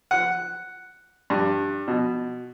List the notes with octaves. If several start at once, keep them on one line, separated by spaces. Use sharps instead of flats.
F#5
G2
B2